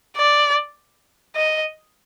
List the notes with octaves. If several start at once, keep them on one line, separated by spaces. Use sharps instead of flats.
D5
D#5